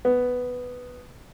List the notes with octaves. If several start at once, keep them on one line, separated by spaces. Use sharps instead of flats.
B3